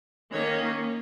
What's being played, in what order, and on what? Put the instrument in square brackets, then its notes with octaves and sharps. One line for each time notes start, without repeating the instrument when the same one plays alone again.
[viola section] D#3 A#3 C#4 C#5